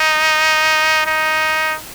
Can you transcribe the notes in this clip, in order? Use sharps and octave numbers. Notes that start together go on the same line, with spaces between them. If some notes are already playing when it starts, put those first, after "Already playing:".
Already playing: D#4
D#4